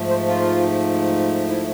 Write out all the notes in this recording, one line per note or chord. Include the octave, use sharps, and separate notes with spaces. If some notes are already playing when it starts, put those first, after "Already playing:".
Already playing: G#2 F3 A3
C5
F4
E4